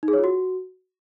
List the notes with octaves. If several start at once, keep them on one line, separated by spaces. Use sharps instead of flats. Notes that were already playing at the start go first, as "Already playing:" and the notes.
D#4
G#4
C#5
F4
F#4